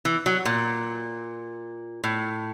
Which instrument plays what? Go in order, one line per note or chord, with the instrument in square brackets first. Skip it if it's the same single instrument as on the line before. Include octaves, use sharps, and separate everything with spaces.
[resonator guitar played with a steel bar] E3
F#3
A#2
A2